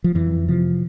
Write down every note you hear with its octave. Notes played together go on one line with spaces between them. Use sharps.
F3
F2 E3
C3 F3